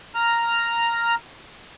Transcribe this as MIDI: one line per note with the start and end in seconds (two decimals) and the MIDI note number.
0.15 1.15 82
0.15 1.15 89